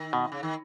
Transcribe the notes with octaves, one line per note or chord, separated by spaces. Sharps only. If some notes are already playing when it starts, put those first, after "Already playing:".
Already playing: D#3
B2
C#3
D#3